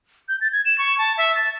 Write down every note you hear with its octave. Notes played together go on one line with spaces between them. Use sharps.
G6
A6
G#6
E7
C#6
A5
E5
A6